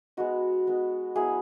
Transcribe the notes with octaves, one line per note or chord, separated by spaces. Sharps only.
G#3 B3 D#4 F#4
G#3 B3 D#4
F#3 B3 E4 G#4